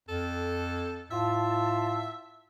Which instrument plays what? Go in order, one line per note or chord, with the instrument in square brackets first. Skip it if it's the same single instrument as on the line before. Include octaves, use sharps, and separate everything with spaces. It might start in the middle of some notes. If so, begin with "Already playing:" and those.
[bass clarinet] F2 [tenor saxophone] A4
[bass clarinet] A2 [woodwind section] F4 A5 [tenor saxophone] E5